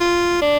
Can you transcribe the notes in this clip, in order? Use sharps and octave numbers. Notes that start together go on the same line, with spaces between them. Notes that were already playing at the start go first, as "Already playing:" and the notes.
F4
D4